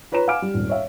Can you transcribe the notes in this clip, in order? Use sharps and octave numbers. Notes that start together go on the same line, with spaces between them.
F4 B4 C#5 A#5 E7
F5 F#5 G#5 D6 F6 D7
G3
D#1 G#1
C#5 E5 F5